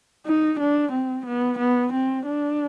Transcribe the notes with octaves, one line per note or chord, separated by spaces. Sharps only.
D#4
D4
C4
B3
B3
C4
D4